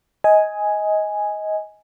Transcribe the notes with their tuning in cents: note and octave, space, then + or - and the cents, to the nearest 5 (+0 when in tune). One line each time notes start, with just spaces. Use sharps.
D#5 +15 G#5 +0